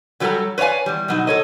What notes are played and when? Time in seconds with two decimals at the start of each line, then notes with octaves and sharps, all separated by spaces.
0.20 D3 F#3 G3 F#4 A4 A#5
0.58 B4 C#5 D5 F5 G#5
0.86 E2 G3
1.08 B2 F#3 D#4
1.27 A4 C#5 D#5